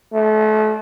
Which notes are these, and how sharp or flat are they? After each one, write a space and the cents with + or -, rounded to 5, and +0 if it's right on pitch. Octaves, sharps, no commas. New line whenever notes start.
A3 -35